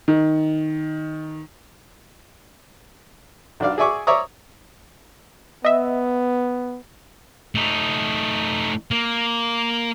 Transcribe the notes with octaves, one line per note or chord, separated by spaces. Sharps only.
D#3
B1 D4 D5 F5
G#4 D5 E5 G#5 C#6 D6
C#5 D5 E5 A#5 C#6 D#6
B3 D#5 E5
A3 D#4
A#3